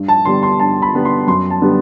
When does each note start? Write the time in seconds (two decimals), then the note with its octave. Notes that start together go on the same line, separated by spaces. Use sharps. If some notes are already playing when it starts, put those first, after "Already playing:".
Already playing: G2
0.08 A5
0.25 D3 G3 B3 C6
0.43 C6
0.60 G2 A5
0.82 B5
0.93 D3 G3 B3
1.05 C6
1.27 F#2 C6
1.50 A5
1.62 D3 G3 B3